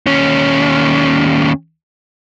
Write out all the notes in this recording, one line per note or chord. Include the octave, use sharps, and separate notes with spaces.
D#2 C#4